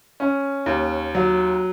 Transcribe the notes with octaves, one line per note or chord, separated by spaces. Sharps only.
C#4
D#2
F#3